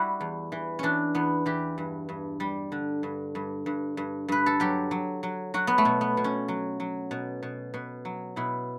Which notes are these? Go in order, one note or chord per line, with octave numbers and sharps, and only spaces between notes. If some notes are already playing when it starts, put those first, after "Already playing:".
Already playing: G3 E4 F#4
E2
E3
E3 C#4 D4
E2 B3
E3 G4
G2
G2
G3
D3
G2
G2
G2
G2
G2 B4
A4
F#3 G4
F#3
F#3
F#3 F#4
B3
A3
B2
B3
B2
C#4
F#3
F#3
B2
B2
B2
F#3
B2 E4